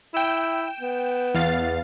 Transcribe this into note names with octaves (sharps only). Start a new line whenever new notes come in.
E4 G5 E7
B3
E2 F5 A6